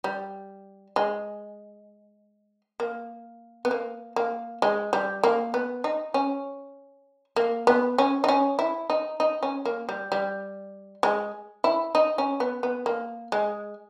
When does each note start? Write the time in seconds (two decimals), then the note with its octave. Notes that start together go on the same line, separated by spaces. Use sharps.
0.04 G3
0.96 G#3
2.80 A#3
3.65 B3
3.71 A#3
4.16 A#3
4.62 G#3
4.93 G3
5.24 A#3
5.54 B3
5.84 D#4
6.14 C#4
7.36 A#3
7.67 B3
7.98 C#4
8.24 D#4
8.28 C#4
8.59 E4
8.90 D#4
9.20 D#4
9.43 C#4
9.65 A#3
9.89 G3
10.12 G3
11.03 G#3
11.64 E4
11.95 D#4
12.18 C#4
12.40 B3
12.63 B3
12.86 A#3
13.32 G#3